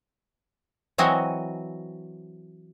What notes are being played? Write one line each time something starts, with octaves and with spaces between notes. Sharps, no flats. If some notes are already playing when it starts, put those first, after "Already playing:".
E3 F#3 C4 F#4 D#5 G#5